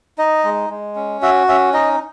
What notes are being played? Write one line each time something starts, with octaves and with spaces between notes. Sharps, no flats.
D#4 D#5
G#3
G#3
C#4
F#4 E5
C#4 E5
D#4 D#5